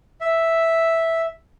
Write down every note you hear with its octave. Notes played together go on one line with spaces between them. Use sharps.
E5